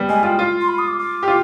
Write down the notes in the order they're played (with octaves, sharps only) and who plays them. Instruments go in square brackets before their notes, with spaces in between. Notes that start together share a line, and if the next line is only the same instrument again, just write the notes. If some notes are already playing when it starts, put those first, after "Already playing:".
Already playing: [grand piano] G3 B3
[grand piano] G#3 [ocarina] G#5
[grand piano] F4 [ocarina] G5
[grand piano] F4
[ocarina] C6
B5
D#6
D6
D6
[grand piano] G4
F4